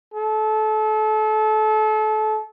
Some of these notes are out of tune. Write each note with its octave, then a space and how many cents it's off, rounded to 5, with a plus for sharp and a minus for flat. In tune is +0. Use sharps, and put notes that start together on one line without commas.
A4 -30